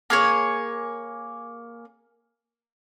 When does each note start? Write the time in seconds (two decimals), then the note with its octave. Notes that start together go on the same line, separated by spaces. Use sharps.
0.10 A#3 G#4 C#5